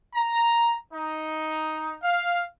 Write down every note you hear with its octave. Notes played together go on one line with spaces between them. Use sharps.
A#5
D#4
F5